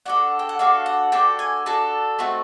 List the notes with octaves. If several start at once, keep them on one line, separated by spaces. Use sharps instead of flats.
D4 F#4 A4 F#5
G5
F#5
D4 F#4 A4 F5
F#5
D4 F#4 A4 G5
G#5
D4 F#4 A4 A5
A3 C4 D#4 F#4